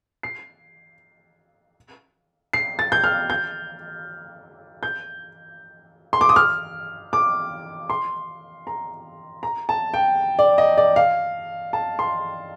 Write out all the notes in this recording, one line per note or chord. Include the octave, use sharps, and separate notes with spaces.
C7
C7
A6
G6
F6
G6
G6
C6
D6
D#6
F6
D6
C6
A#5
A#5
A5
G5
D5
D#5
D5
F5
A5
C6